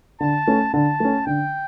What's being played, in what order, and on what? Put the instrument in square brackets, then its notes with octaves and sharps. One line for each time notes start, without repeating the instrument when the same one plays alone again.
[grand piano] D3 [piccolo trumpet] A5
[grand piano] A3 C#4
[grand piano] D3 [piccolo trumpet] A5
[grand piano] A3 C#4
[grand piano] D3 [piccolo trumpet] G5